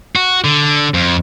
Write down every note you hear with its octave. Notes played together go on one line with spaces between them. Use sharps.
F#4
D3
F2